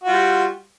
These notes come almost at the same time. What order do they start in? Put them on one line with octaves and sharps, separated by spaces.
F#4 F4 G3